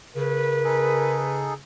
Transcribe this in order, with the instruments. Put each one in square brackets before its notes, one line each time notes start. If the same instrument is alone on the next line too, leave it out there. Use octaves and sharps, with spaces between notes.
[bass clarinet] C#3 [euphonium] A#4 [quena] B4
[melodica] D#4 G#4 A4